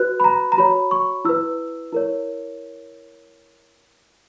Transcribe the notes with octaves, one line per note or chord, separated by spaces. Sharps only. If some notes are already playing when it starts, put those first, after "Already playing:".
Already playing: F#4 B4 F#6
B5
A#5
A#5
F#4 C#5 B5
C#6
E4 B4 E6
E4 A#4 C#5